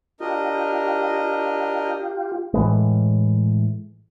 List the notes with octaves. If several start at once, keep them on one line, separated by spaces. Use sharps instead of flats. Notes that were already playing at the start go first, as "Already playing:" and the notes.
D4 F4 G4 A#4 D#5
A2 E3 G#3